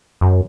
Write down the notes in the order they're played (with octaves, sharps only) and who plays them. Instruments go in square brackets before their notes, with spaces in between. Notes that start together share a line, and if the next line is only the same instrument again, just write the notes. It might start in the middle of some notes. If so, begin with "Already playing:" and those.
[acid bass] F#2